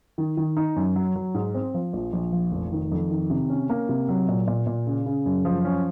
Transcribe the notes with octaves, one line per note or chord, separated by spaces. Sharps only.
D#3
D#3
D#4
F#2
F#3
F#3
G#2
C4
F3
A#1
A#1
F3
F1
D#3
F2
D#3
C3
C#4
A#3
C3
F#3
A#2
A#2
A#2
C#3
C#3
F#2
F3
C#4